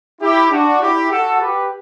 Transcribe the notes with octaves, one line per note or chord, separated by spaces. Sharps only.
E4 G4
D4 F#4
E4 G4
F#4 A4
G4 B4